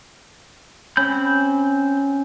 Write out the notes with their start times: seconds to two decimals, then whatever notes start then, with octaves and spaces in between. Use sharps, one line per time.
0.97 C4 C#4 B5 G6